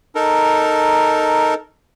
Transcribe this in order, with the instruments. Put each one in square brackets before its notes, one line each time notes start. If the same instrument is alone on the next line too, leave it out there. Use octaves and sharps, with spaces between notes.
[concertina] D#4 A4 A#4